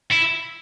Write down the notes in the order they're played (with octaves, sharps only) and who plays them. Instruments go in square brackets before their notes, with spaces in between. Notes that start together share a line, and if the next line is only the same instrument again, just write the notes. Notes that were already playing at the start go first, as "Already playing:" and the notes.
[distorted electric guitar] E4